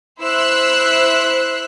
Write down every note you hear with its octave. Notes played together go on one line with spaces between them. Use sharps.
E4 C5 E6 F#6